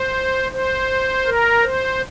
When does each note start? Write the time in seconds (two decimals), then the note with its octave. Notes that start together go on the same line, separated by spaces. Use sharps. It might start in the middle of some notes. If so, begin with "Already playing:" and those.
Already playing: C5
0.52 C5
1.26 A#4
1.63 C5